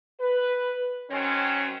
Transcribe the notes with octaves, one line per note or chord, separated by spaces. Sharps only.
B4
D#3 F#3 C4 C#4